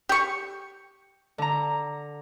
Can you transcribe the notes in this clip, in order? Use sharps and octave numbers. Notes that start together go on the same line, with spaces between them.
G4 C#6
D3 A#5